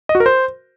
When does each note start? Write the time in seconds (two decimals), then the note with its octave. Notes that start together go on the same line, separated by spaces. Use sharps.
0.09 D#5
0.15 F#4
0.20 A#4
0.26 C5